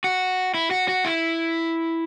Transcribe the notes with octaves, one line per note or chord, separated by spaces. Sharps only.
F#4
E4
F#4
F#4
E4